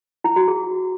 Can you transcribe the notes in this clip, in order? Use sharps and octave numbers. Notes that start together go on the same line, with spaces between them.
E4
F#4
G#4